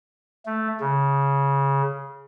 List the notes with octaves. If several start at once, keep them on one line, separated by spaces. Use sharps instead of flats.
A3
C#3